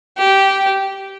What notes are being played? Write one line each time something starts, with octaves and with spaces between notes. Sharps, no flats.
G4